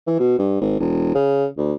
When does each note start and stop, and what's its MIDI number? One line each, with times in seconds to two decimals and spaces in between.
0.07 0.16 52
0.19 0.38 47
0.39 0.57 43
0.61 0.75 32
0.80 1.14 28
1.15 1.46 49
1.58 1.74 38